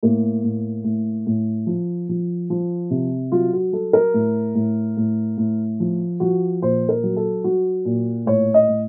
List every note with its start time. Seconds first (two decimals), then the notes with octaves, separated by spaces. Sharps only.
0.03 A2 A#3
0.44 A2
0.84 A2
1.27 A2
1.67 F3
2.09 F3
2.50 F3
2.90 C3
3.32 F#3 F4
3.53 F#4
3.73 F#3 A4
3.93 A#4
4.14 A2
4.55 A2
4.97 A2
5.38 A2
5.80 F3
6.20 F3 F#4
6.62 A#2 C5
6.89 A#4
7.03 F#3
7.17 A4
7.44 F#3 F#4
7.85 A#2
8.26 A2 C#5
8.54 D#5
8.68 A2